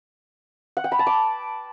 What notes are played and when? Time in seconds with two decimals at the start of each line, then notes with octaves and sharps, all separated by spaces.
0.77 F#5
0.84 G5
0.92 B5
0.99 A5
1.07 D6